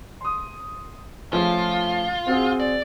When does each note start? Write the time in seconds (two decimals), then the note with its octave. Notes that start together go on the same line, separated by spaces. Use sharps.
0.21 C6 D#6
1.33 F3 A3 C#4 F4
2.27 C4 F#4 G#4
2.60 D5